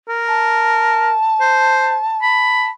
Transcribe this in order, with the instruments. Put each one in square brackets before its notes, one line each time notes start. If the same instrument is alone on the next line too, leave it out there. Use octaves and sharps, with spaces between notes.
[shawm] A#4
[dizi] A5
[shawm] C5
B5